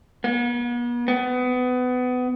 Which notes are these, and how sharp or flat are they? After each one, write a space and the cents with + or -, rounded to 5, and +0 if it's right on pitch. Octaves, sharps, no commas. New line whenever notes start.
B3 -40
B3 +25